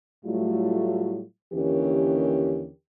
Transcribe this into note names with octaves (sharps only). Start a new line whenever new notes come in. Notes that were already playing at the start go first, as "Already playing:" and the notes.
A2 F#3 G3 A3 E4 F4
D#2 D3 E3 C#4 G4 A#4